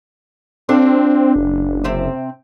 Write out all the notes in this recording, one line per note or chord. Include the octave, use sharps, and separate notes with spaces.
C4 D4 F4 A4
F#1
C3 C4 E5